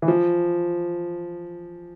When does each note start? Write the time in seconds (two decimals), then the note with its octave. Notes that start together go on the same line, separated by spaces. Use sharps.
0.02 E3
0.08 F3